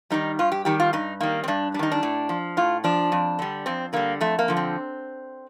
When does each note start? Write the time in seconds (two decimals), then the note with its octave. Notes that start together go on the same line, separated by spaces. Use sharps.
0.10 D#3 G3 D#4
0.39 G2 F4
0.52 G4
0.65 D#3 G3 G4
0.80 F4
0.93 G2 D#4
1.20 D#3 G3 A#3
1.44 C4
1.48 G2 D4
1.74 G3 D4
1.79 D#3 D#4
1.92 D4
2.03 A2
2.29 F3
2.57 A2 F4
2.84 F3 D4
3.12 F2
3.39 D3 G3
3.66 F2 C4
3.93 D3 G3 A#3
4.20 F2 A3
4.39 A#3
4.48 D3 F3
4.57 C4